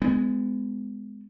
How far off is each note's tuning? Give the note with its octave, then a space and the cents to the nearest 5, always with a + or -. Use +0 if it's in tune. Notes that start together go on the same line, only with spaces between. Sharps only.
G#3 +5 B3 +35